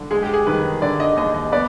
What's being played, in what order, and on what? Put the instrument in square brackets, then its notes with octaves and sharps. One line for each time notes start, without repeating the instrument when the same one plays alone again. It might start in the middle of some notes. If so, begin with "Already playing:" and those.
Already playing: [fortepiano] D3
[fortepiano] G#3 [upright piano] G#4
[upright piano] G4
G#4
[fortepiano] D#3 [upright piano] B4
[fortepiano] D3 [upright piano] D5
[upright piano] D#5
[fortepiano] D#2 [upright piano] D#5
[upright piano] D#5
[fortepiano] B3 [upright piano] D5